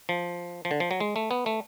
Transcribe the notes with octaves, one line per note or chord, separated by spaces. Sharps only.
F3
F3
D3
F3
F#3
G#3
A3
B3
A3